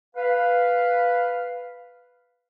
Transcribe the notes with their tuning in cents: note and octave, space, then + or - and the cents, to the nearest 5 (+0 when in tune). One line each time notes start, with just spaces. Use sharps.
B4 +0 F5 +0